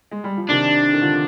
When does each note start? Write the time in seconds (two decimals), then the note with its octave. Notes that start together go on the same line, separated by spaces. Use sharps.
0.11 G#3
0.24 G3
0.37 F3
0.50 C3 D#3 D4
0.94 D#3
1.02 D3 F3